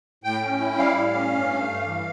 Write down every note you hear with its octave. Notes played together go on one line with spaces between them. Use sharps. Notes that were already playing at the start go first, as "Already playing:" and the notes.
A2 G5
C#4
E4
G3 F5
A2
C#4
G2
A3
G2
E3